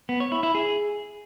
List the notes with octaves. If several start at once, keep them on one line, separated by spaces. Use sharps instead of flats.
B3
C#5
E4
E4
G#4